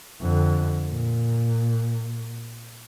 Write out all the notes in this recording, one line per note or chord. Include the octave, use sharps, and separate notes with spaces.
F2 D3
A#2